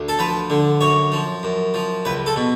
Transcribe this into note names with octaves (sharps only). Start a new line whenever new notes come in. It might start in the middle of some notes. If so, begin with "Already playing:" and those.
Already playing: D2
A4
F3 B4
D3
F#2 C#5
F3
F#2
F3
C#2 B4
A4
B2